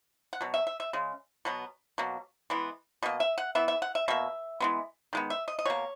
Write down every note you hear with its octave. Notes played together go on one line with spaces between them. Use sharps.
F#5
B2 F#3
E5
E5
E5
C#3 G#3
B2 F#3 B3
B2 F#3 A#3
E3 G#3 B3
B2 A#3 D#5
E5
F#5
E3 B3 E5
E5
F#5
E5
B2 A#3 E5
E3 G#3 B3
D#3 G#3 B3
E5
D#5
D#5
B2 A#3 C#5